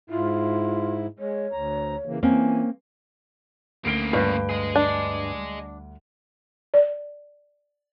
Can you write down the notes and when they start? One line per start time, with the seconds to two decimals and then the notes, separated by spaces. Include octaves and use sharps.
0.10 G#2 E4 F4
1.19 G#3 C#5
1.52 D2 A#5
2.06 C#3 E3 A#3
2.23 E3 A#3 C4 C#4 G#5
3.85 D2 C#3 A#3 D7 G7
4.13 G2
4.49 G#4 D#5
4.76 D4
6.74 D5